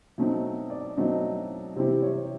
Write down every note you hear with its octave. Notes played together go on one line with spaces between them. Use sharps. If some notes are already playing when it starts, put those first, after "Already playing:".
B2 F#3 A3 C4 D#4
D5
B2 F#3 A3 C4 D#4 D#5
C3 E3 G3 C4 E4 C5
C#5